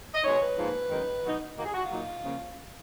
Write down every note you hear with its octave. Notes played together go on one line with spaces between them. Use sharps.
D#5
B2 G#3 D#4 C#5
B4
G#2 F3 A#3
F#2 D#3 G#3 D#4
B2 F#3 B3 D#4
D#2 D#3 A#3 D#4 F#4
G#4
F#4
F4
A#2 F#3 A#3 D#4
C#3 F3 A#3